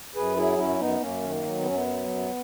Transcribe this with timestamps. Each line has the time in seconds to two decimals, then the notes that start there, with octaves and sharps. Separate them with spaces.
0.16 F#2 G#4 B4
0.36 F#3 E4 G#4
0.58 F#2 C#4 E4
0.79 F#2 B3 D#4
1.01 F#2 A#3 C#4
1.23 D#3
1.29 A#3
1.44 F#3
1.59 B3
1.66 F#2 C#4
1.75 B3
1.87 F#3
2.08 F#2